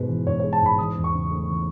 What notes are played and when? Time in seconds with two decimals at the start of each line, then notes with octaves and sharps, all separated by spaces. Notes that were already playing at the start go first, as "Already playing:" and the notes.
Already playing: G#2 B2 G#3 B4
0.09 E3
0.27 G#2 C#5
0.40 G#3 C#5
0.53 A5
0.62 G#2 B5
0.78 E3 D#6
0.96 E2
1.04 C#6
1.13 C#3
1.31 A3
1.48 E3